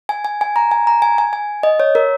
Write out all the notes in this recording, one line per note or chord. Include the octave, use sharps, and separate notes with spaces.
G#5
G#5
G#5
A#5
G#5
A#5
G#5
G#5
G#5
D#5
C#5
A#4